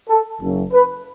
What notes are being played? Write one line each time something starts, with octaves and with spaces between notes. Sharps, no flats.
A4
F#1 F#2 C#3
B4